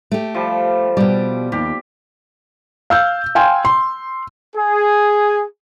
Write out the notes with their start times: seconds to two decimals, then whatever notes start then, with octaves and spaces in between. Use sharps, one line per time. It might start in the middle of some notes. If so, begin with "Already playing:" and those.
0.12 A3 G4
0.34 F3 G3
0.97 B2 G3 D5
1.52 D#2 G4
2.90 F5 E6 G6
3.35 F5 G5 G#5 C6
3.65 C6
4.56 G#4